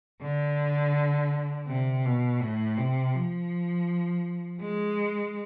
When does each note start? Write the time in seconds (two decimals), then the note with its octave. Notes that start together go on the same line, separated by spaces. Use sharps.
0.22 D3
1.68 C3
2.05 B2
2.40 A2
2.78 C3
3.15 F3
4.60 G#3